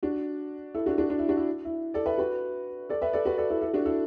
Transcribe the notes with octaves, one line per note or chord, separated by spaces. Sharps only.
D4 F#4
E4 A4
D4 F#4
D4 F#4
D4
E4
D4 F#4
E4
E4
A4 D5
B4 E5
F#4 B4
A4 D5
B4 E5
A4 D5
F#4 B4
A4 D5
E4 A4
E4 A4
D4 F#4
E4 A4